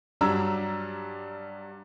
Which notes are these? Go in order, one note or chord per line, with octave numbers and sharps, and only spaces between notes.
G2 F#3 G3 D4 A#5 E6